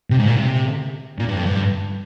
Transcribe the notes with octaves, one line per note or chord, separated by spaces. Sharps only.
C3
G#2
A#2
C3
A#2
G2
F2
G2